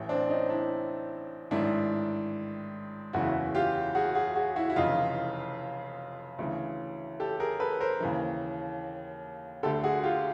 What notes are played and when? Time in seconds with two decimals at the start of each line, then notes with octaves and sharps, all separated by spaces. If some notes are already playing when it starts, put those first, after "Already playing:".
Already playing: A1 A2 E3
0.09 C4 D4
0.29 C#4 D#4
0.50 D4 E4
1.51 A1 G#2 D#3 D4 E4
3.13 F#1 E2 C#3 E3 E4 F#4
3.55 F4 G4
3.95 F#4 G#4
4.15 F#4 G#4
4.35 F#4 G#4
4.56 E4 F#4
4.70 E4
4.76 F1 F2 C#3 E3 D#4 F4
6.39 D2 C#3 E3
7.20 G4 A4
7.40 G#4 A#4
7.60 A4 B4
7.80 A#4 C5
8.00 D#2 C#3 E3
9.63 D2 D3 G4 A4
9.84 F#4 G#4
10.04 F4 G4